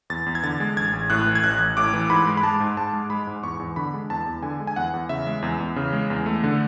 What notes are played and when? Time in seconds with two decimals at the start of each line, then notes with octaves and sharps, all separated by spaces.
0.10 E2 A6
0.26 E2
0.35 G#6
0.43 D3 A6
0.60 G#3
0.77 A1 G#6
0.93 A1
1.10 A2 F#6
1.26 E3
1.35 G#6
1.43 A1 F#6
1.60 A1
1.77 A2 D6
1.93 E3
2.10 G#2 B5
2.27 G#3
2.37 B5
2.43 G#3 A5
2.60 G#2
2.77 G#2 A5
2.93 G#3
3.10 G#3 B5
3.27 G#2
3.43 E2 C#6
3.60 E2
3.76 D3 B5
3.94 G#3
4.10 E2 A5
4.27 E2
4.43 D3 G#5
4.60 G#3
4.67 G#5
4.76 E2 F#5
4.94 E2
5.09 C#3 E5
5.27 G#3
5.42 E2
5.60 E2
5.76 C#3
5.93 G#3
6.10 E2
6.26 A3
6.44 D3